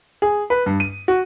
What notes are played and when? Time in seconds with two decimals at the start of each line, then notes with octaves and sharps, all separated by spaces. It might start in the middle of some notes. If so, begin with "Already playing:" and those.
0.22 G#4
0.50 B4
0.66 G2
0.80 D#7
1.08 F#4